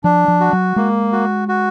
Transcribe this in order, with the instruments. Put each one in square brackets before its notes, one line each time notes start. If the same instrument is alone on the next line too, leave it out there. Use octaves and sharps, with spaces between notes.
[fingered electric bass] F3 [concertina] D4
[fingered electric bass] F3
[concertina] F#4
[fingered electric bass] F#3
[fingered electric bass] G#3 [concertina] A#3
[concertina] F#4
F#4